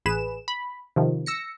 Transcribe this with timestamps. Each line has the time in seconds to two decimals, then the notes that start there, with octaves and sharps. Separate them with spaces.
0.06 A1 G#4 B4 E7
0.48 B5
0.96 C3 D#3 F3
1.26 E6 A#6 C#7